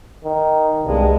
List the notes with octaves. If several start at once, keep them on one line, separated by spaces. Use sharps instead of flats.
D#3
C2 G2 G#3